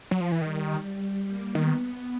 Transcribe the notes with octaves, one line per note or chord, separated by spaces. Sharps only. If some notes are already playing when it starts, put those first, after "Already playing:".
F#3
F3
E3
D#3 G3
G3
A#3
D#3 B3